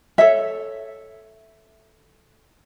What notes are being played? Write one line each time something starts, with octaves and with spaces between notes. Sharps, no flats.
A4 C#5 E5